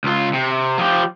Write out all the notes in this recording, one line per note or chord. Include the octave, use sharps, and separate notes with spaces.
C#2 F4
C3
F3 G4